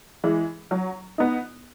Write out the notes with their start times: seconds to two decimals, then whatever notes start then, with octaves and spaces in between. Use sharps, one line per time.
0.24 E3 G#3
0.71 F#3
1.18 B3 D#4